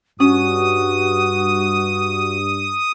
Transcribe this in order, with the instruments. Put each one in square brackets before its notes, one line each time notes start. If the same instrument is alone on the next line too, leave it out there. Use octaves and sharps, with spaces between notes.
[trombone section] G2 [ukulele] C#4 [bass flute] F#4 [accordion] D#6